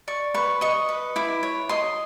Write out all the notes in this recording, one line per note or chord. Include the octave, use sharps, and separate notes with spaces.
D5 C#6
B4 C#6
D#5 C#6
B4
E4 D6
C#5
D#5 C6